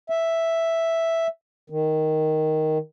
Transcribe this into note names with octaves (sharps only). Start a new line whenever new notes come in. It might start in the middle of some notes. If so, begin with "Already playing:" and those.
E5
D#3